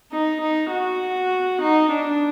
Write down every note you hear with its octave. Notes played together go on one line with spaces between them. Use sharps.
D#4
D#4
F#4
D#4
D4